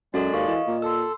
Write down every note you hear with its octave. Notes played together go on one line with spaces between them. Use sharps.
F#2 G#3 F#4 A4 A#4 D5
D#2 F5 C#6
E3 D#5
A#2 A#3
A4 C6 E6